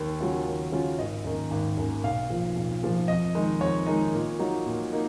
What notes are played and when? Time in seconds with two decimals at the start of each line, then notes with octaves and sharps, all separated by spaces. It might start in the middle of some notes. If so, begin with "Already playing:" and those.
Already playing: D#2
0.20 C#3 F#3 C#4 F4
0.46 D#2
0.72 C#3 F#3 C#4 F4
0.99 G#1 D#5
1.24 F#2 D#3 A#3
1.51 G#1
1.77 F#2 D#3 A#3
2.04 B1 F5
2.30 A#2 F3
2.56 B1
2.82 A#2 F3
3.08 F2 D#5
3.35 D#3 G#3 D#4
3.61 F2 C#5
3.86 D#3 G#3 D#4
4.13 A#2
4.39 F#3 A#3 D#4
4.66 A#2
4.92 A#3 D#4